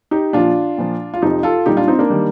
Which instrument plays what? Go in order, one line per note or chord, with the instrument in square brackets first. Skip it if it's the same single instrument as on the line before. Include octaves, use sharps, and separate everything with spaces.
[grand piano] D#4 G4
A#2 F3 D4 F4
A#2 F3
F4
F2 C3 F3 D#4 G4
F4 A4
A#2 G3 D#4 G4
D4 F4
C4 D#4
A#3 D4
D#3 G3